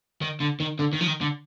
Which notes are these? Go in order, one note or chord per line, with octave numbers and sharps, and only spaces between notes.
D#3
D3
D#3
D3
D#3
F3
D#3
D3